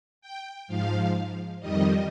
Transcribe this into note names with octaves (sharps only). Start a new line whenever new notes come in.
G5
G#2 F3 F5
F2 D#3 G3 D#5